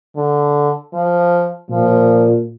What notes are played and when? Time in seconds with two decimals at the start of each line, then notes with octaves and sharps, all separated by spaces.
0.16 D3
0.93 F3
1.70 A#2 F3